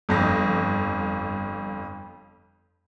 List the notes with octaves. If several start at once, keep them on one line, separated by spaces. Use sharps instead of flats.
G1 F2 A#6